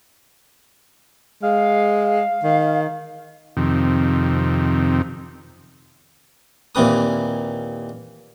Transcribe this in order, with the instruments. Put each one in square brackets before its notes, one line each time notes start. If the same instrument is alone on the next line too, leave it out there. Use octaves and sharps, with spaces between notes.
[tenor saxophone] G#3 [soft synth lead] F5
[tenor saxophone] D#3
[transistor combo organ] F2 C3 D#3
[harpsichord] D#2 A#2 E3 C4 B4 D#6